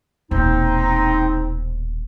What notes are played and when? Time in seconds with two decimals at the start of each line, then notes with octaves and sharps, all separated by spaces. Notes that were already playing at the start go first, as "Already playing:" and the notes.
0.31 D#1 B2 C4 D#4